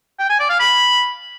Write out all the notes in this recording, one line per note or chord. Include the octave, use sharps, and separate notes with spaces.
G5
G#5
D5
F5
B5